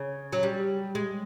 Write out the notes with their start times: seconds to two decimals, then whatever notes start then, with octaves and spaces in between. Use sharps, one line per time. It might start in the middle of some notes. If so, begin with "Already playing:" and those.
Already playing: C#3
0.32 F#3
0.43 G3
0.95 G#3